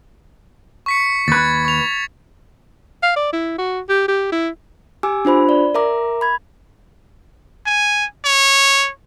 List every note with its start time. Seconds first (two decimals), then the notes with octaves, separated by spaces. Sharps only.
0.86 C#6 B6 C#7
1.28 D#2 B4 G#6 A6
1.65 C#6 F7
3.03 F5
3.16 D5
3.33 E4
3.58 F#4
3.89 G4
4.08 G4
4.32 E4
5.03 G4 G#5 D6 E6
5.25 D4 F4 C5 B5
5.49 D5
5.75 A#4 E5 A#5 D6
6.21 B5 G#6
7.67 G#5
8.25 C#5